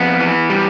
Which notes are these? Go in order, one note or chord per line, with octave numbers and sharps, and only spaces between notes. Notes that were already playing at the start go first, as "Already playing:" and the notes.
Already playing: F2 B3
E3
G3